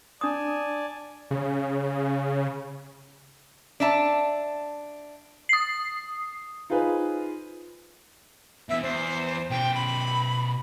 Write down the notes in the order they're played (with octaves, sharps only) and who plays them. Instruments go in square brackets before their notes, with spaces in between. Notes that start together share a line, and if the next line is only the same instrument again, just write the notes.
[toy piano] D4 D#6 [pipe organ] D5 G#5 A5
[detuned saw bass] C#3
[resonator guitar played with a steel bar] D4 E5 A5
[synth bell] D#6 C7
[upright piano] D#4 F4 G#4 B4 C5 G#5
[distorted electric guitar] B2 E3 [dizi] E5
[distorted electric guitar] E2 [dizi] C5
[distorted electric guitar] B2 C5 [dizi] G5
[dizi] B5